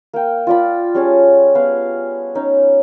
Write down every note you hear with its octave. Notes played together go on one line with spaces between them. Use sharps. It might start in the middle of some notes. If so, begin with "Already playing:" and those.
A#3 G5
F4 D5 B5
G3 C#4 G#4 A5
B3 B4 F5
C#4 D#4